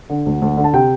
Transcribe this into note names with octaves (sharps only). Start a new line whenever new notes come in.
D3
D2
D2
D3
A5
C3 G5